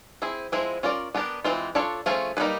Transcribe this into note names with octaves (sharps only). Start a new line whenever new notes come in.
C4 E4 G#4
F3 G#3 C4 E4 G#4
C#4 F4 A#4 D5
B3 D4 G4 A#4
E3 G#3 C4 F4
D4 F4 A4 C#5
F3 A3 C#4 F4 G#4
G3 A#3 D#4 G#4 B4